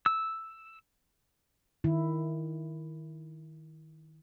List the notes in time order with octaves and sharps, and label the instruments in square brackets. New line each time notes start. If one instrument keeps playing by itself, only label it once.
[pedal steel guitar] E6
[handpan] D#3 E4